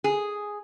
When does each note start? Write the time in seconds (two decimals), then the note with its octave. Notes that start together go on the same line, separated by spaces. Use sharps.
0.04 G#4